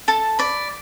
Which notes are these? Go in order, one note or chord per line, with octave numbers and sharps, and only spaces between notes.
A4 A5
D5 B5